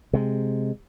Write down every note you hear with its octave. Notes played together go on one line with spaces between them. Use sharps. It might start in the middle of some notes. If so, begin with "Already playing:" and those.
C3 G#3